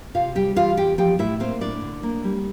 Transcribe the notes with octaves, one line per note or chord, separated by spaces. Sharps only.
C3 F4 F5
G3 G4 G5
E3 F4 F5
E2 G4 G5
F3 G4 G5
A2 E4 E5
A#3 C4 C5
A2 D4 D5
D3
A#3
G3